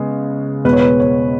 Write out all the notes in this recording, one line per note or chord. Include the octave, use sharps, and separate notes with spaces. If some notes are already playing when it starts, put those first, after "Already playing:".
Already playing: C#3 G#3 B3
E2 B2 G#3 B3 B4
C#5
B4
C#5